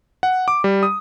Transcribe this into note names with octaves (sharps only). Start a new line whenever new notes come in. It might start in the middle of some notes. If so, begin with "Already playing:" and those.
F#5
D6
G3
D#6